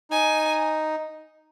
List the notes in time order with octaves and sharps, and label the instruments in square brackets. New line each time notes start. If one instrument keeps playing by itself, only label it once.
[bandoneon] D#4 [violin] G#5